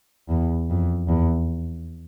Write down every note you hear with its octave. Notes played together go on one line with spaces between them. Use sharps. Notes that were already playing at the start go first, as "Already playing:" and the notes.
E2
F2
E2